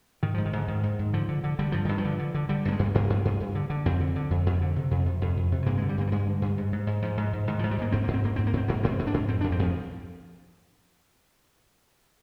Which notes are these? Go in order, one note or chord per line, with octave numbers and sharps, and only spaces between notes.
G#2 D#3
G#2 F3
D#3
G#2 D3
G#2 D#3
G#2
G#2
D3 F3
D3
D3
D3 G3
G2 F3
G2 D#3
F3
D3
D3
D3
D3 G3
G2 A#3
G#3
G2
G2 A#3
G2
G2
G2
D3
D3
F2 C4
D3
D3
F2
F2
D3
C3
F2
C3
F2
F2
C3
G2 A#3
D3 G#3
G3
G2 A#3
G3
G2 G#3
D3
G2
G#2
G#2
G#2
G#2 F3
G#2
G#2
G#2 D#3
G#2 F3
G3
G#2 A#3
G#2 C4
G#2 A#3
C4
G#2 A#3
G#2 C4
A#3
G#2 C4
G#2 A#3
G#2 C4
G#2
D4
G#2
F2 C4
F2 D4
C4
F2 F3